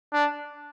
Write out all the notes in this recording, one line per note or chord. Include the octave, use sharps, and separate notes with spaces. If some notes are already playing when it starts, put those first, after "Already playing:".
D4